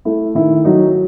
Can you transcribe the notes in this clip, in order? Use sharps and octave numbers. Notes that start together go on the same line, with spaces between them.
A3 E4
D#3 E4
F#3 D#4 F#4